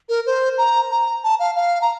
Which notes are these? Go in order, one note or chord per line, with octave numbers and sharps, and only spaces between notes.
A#4
C5
A#5
A#5
A5
F5
F5
A#5